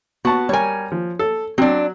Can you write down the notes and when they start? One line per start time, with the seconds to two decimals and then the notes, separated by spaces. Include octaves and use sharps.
0.25 B3 F#4 A5
0.49 G3 A#4 C#5 G#5
0.92 F3
1.19 A4
1.58 F#3 C4 D4